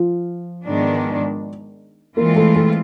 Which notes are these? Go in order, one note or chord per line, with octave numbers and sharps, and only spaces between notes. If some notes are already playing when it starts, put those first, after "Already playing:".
Already playing: F3 F4
G#2 D#3 G#3 B3 D4
E3 G#3 A#3 C4 F4 A#4
A3 A4
A3 A4